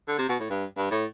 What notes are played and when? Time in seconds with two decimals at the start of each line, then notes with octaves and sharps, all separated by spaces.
0.08 D3
0.18 C3
0.29 B2
0.40 A2
0.50 G2
0.77 G2
0.91 A2